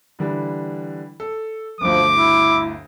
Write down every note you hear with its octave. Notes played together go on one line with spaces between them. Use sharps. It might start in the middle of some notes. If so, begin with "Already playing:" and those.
D3 E3 G3
A4
G1 D2 F3 D6
E4